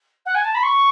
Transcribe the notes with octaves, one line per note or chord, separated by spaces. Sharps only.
F#5
G#5
A5
B5
C#6